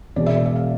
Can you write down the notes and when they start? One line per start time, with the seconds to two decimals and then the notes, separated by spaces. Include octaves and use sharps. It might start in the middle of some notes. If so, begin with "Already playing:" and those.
0.16 E1 E2 B2 D5
0.26 E5
0.46 E5
0.56 F5